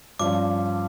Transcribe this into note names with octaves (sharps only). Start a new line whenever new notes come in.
G2 F3 C#4 D6